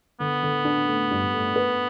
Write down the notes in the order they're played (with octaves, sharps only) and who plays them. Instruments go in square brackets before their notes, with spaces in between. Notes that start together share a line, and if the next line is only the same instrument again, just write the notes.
[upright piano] D3 [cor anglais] B3
[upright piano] D3
D4
A3
G2
A3
B4